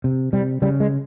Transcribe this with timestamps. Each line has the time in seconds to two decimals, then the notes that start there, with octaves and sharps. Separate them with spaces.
0.04 C3
0.33 C3 G3
0.62 C#3 G3
0.80 G#3